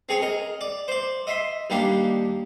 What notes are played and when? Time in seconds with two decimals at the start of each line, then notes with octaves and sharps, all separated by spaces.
0.09 C4 G#4 C#5
0.22 A#4 D#5
0.61 D5
0.88 C5 D5
1.27 D#5 E5 C6
1.70 D#2 G3 A#3 D4